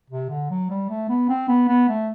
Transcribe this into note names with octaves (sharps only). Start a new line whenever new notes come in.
C3
D3
F#3
G3
A3
B3
C4
B3
B3
A3